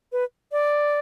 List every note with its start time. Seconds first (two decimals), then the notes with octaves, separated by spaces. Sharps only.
0.12 B4
0.52 D5